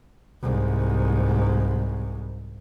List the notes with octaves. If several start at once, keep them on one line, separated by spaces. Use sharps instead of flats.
C2 G#2